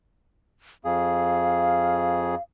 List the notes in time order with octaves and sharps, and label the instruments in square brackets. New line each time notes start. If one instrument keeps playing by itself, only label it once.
[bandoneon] F2 G#4 [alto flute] F5